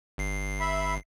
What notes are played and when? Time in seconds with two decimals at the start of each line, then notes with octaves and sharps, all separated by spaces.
0.18 G1 C7
0.60 E5 B5